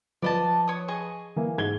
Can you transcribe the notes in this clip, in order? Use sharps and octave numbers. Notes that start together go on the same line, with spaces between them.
F3 B4 D5 D#5 A5
C#5 D#6
G#4 D#5 C#6
E3 A#3
G#2 G#6 G7